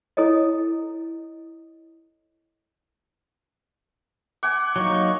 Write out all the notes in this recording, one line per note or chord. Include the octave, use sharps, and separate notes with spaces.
E4 A4 C#5 D#5
F#5 G#5 D6
F#3 A#3 D#4 C#6